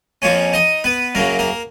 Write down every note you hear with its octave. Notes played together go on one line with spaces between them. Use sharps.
F2 F3 A#3 C#4 C#5
D#4 D#5
B3 B4
F#2 C#3 F#3 A#3 A#4
A#3 A#4